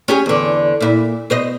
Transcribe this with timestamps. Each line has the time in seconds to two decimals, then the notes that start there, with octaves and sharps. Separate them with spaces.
0.08 C#4 G4 G#4
0.26 E2 D3
0.81 A#2 E4
1.30 B2 C5 D#5